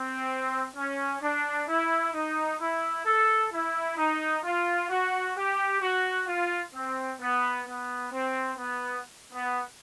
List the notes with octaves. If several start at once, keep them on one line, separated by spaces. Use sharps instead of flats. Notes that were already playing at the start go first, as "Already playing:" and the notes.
Already playing: C4
C#4
D4
E4
D#4
E4
A4
E4
D#4
F4
F#4
G4
F#4
F4
C4
B3
B3
C4
B3
B3